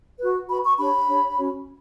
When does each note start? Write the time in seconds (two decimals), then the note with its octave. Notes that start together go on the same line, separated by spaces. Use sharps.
0.19 F#4 B4
0.48 F#4 B4 B5
0.63 C#6
0.78 D4 G4 C#5 B5
1.07 D4 G4 C#5
1.37 C#4 F#4 C#5